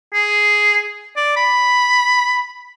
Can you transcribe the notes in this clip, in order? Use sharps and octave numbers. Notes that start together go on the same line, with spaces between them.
G#4
D5
B5